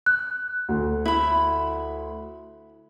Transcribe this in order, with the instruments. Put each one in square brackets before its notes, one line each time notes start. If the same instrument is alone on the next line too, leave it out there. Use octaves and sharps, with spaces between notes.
[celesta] F#6
[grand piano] D2
[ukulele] E4 B5